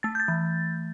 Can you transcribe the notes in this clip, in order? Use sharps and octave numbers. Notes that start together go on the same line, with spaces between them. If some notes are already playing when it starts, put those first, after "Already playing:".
A3 A6
G6
A6
E3